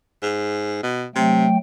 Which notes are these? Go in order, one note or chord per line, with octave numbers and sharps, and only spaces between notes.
G#2
B2
C3 F#3 A3 G5